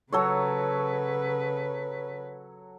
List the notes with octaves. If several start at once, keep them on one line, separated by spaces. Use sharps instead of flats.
C#3 F#3 A4 B4 C#5